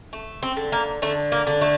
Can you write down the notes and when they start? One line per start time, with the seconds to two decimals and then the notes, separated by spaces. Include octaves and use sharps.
0.13 A3
0.43 C4
0.57 D3
0.72 A#3
1.02 D3 A3
1.32 A#3
1.47 D3
1.61 A3